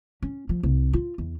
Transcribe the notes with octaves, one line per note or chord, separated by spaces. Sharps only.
C#4
F3
C2
F4
E2